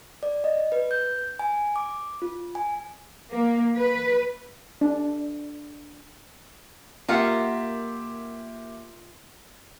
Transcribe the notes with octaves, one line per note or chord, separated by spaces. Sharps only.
D5
D#5
B4
G6
G#5
D6
F4
G#5
A#3
B4
D4
A#3 F4 G4 A#4 E5 F#5